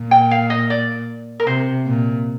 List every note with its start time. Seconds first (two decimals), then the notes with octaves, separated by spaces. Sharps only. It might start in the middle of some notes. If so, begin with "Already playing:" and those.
Already playing: A#2
0.11 G5
0.31 F5
0.50 D#5
0.70 D5
1.40 A#4
1.47 C3 C5
1.86 A#2